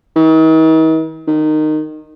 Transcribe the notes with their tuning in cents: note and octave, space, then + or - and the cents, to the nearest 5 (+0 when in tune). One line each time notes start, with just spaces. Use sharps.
D#3 +45
D#3 -15